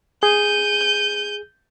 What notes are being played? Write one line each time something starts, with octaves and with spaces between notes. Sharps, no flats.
G#4 G6 D#7